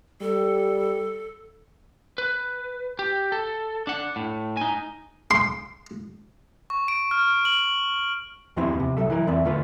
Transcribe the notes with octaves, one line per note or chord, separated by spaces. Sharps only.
G3 A4
B4
G4
A4
D4 F#5
A2
D#4 G#5
C6
C#6
D7
F6
F#7
D#2 F3 B3 C4 E4 C5
C3
C2 F#2 F#3 A4 E5
E3 E4 A#4
E2 E3 C4 D5 E5
D3 A3 F4 B4